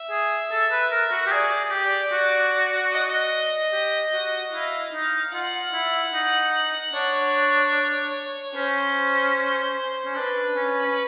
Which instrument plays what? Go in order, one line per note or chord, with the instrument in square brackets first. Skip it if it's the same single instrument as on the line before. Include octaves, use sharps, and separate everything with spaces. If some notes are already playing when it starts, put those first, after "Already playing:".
Already playing: [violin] E5
[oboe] G#4
A4
B4
A#4
F#4
G4
[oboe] G#4 [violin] D5
[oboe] G#4
G4
F#4
[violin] D#5
[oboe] G4
F#4
[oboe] E4 [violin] F5
[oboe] D#4
[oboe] F4 [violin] F#5
[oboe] E4
D#4
[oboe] D4 [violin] C#5
[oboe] C#4 [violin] C5
[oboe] C#4
[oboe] D4 [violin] B4
[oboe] C#4
C#4